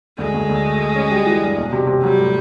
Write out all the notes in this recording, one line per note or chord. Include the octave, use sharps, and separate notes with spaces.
D2 G#3
D2
D2
A3
A3
C#4
G3
E3
G2
E1
C3
C3
F#3 G3
A2